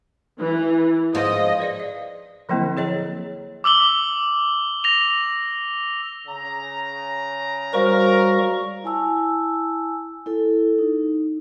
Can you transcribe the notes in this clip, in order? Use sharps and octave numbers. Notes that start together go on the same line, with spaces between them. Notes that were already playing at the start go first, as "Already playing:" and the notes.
E3
G#2 F3 D#5
B4 D5 F5
D#5
D3 F3 F#3 A#3 C4 E4
G#4 C#5 D#5 A#5
D6 E6 F#7 G7
A#6 F7
C#3 A#5
G3 F#4 A#4 C5 F5 C#6
E4 G#5 A5 E6
E4 A4
D#4